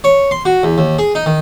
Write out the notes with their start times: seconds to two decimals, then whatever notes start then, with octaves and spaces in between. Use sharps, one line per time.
0.04 C#5
0.31 C6
0.45 F#4
0.63 E2
0.78 D#2
0.99 G#4
1.15 D#4
1.26 D#3